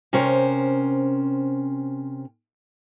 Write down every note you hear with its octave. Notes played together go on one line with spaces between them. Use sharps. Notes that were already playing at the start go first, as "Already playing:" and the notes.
C3 C#4 A#4 C5